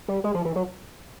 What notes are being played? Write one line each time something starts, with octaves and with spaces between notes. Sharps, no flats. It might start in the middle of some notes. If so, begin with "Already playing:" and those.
G3
G#3
F3
E3
F#3